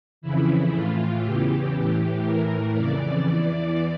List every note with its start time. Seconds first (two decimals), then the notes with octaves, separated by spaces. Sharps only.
0.21 F2 C#3 E3 E4
0.72 A2 E3 F4
1.23 E2 C#3 E3 G4
1.74 A2 E3
2.25 A2 E3 A#4
2.75 F2 C#3 E3 D5
3.26 E2 E3